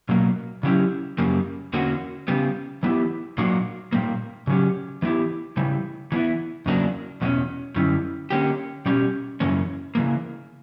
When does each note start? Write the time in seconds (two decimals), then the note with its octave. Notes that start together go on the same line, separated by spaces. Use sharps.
0.09 B2 F#3 A#3
0.63 C#3 F#3 C#4 E4 G4
1.18 F#2 C#3 G3 A#3
1.73 E2 D3 A#3 C#4 F#4
2.28 C#3 G3 B3
2.83 E3 B3 E4 G4
3.38 A#2 F#3 A#3 D4 F#4
3.93 A#2 G3 A#3
4.47 C#3 F#3 C#4 G4
5.02 E3 B3 E4 G4
5.57 C#3 E3 G3
6.12 E3 B3 E4
6.66 E2 C#3 F#3 A#3 D4
7.21 E2 B2 A#3 C#4
7.76 F#2 D3 G3 C#4 E4
8.30 D3 A#3 C#4 G4
8.86 B2 G3 C#4 G4
9.40 F#2 C#3 E3 A#3 C#4
9.95 C#3 E3 A#3